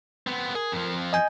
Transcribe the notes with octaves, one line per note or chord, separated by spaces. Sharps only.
B3 C4
G#4 A#4
F2 F3
D#5 G#5 G6